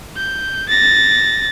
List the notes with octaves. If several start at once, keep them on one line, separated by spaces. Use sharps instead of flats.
G6
A6 A#6